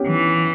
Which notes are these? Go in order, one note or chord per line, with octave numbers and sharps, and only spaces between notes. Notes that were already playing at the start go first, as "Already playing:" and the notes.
Already playing: B3 C#4 G4
E3